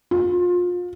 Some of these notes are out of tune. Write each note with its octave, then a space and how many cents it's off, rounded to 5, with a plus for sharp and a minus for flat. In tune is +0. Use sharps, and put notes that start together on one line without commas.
F4 +30